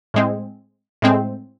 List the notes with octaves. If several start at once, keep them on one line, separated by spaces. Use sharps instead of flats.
A2 G#3 C4
A2 G#3 C4